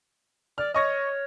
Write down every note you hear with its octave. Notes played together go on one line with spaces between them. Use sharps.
D5 F6
C#5 D#5 C#6 A#6